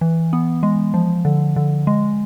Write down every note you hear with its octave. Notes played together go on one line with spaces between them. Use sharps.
E3
B3
G#3
F3
D3
D3
G#3